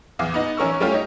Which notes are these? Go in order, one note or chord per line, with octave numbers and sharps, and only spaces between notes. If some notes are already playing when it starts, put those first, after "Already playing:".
E2 E3 F5 D6
B3 D#4
E3 C#4 A#4 C#6 E6
G3 A3 C#4 F4 G4
D#4 C#5